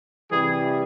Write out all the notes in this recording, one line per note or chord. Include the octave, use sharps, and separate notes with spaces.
C3 E3 G3 G#4